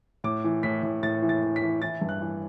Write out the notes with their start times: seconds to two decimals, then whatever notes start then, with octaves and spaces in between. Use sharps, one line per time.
0.24 A2 D6
0.44 E3
0.63 A2 B6
0.83 A2
1.03 A2 A6
1.22 E3
1.29 A6
1.43 E3
1.56 B6
1.62 E3
1.81 E3 A6
2.01 G2
2.09 F#6
2.22 E3